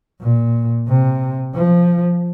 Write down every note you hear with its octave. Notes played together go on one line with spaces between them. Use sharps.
A#2
C3
F3